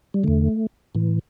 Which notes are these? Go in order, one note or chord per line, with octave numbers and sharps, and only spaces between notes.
G3
E2 D3 A3
A2 E3